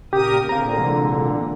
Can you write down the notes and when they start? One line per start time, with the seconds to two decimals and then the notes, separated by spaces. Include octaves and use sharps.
0.13 A#2 C#3 G4 A#4 D#6
0.49 A#2 D3 A#3 C4 G#4 F5 A#5
0.78 C3 E3 G#3